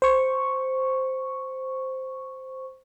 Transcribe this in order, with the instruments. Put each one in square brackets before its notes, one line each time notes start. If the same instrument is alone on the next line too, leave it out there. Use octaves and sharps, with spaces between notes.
[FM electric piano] C5 C#6